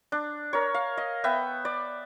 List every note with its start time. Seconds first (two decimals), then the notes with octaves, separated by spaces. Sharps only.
0.12 D4
0.53 A#4 C#5
0.74 F5
0.97 D#5
1.24 B3 E5 G5
1.65 D5